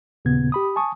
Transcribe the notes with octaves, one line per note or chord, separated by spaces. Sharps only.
D#2 A#2 C#3 B3 G#6
G4 B5 D#6
G#5 A5 C#6 D#6